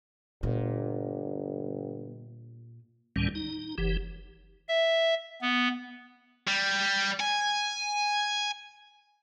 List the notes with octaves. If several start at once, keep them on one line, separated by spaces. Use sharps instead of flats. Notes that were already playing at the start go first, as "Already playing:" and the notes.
G1 A#2
D2 A2 D#3 G3 C#4
D#4
F#1 E3 G4
E5
B3
G3
G#5